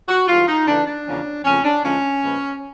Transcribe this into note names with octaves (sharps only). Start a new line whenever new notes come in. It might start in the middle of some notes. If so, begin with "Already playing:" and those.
F#4
G#2 E3 G3 F4
D#4
C#3 E3 A3 D4
D4
E2 C#3 F3 A#3 C#4
F2 C#3 F3 A3 C#4
D4
D2 D3 F3 G#3 C#4
A#2 F3 G#3 B3